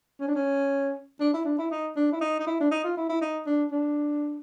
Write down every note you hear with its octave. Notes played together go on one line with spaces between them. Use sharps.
C#4
D4
C#4
D4
E4
D4
E4
D#4
D4
E4
D#4
D#4
E4
D4
D#4
F4
E4
E4
D#4
D4
D4